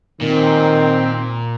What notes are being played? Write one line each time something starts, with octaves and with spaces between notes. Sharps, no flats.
A#2 D#3 C4